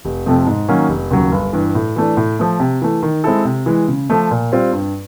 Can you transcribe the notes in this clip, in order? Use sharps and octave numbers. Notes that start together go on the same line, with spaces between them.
F1
F2 C3 F3 A3
G#2
D#3 F#3 A#3 C#4
F1
D#2 C#3 F#3
G1
G2 E3
A2
E3 A3 D4
A2
F3 A3
C3
E3 A3
D#3
G#3 C4 E4 A4
C3
E3 G#3
C#3
F3 A3
A#2
G3 C4 F4
G2